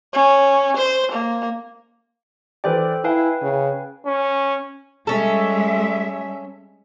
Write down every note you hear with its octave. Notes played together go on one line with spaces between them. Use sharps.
C#4
C5
A#3
E3 A4 B4 C5 D5 G5
E4 B4 F5 G5 G#5
C#3
C#4
G3 G#3 C#4 A4 E5